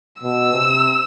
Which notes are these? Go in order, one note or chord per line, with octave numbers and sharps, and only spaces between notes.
B2 E6
C3